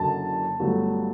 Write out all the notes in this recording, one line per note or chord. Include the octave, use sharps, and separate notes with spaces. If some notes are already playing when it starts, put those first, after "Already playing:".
Already playing: F#1 F#2 D3 F#3 A5
G1 G2 F#3 A3